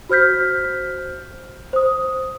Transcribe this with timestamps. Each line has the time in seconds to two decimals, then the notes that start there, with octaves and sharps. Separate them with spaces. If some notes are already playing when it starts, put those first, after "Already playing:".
0.09 F#4 C5 F6 G6 B6
1.73 C5 D#6